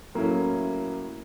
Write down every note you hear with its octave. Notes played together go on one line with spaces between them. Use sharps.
A2 F#3 A#3 C#4 E4